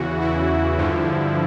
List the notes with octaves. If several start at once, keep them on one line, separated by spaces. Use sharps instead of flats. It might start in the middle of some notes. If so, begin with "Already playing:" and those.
Already playing: E2 C#3 E3 F#4
E4
G2 D3 F3